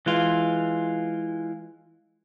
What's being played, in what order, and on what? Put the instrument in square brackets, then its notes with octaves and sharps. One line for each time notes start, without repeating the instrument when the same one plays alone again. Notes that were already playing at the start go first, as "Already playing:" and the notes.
[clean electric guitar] E3 G#3 F4